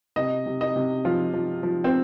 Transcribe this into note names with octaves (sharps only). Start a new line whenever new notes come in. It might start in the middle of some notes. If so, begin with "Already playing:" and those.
C3 D#5
C3
D#5
C3
F3 F4
F3
F3
C4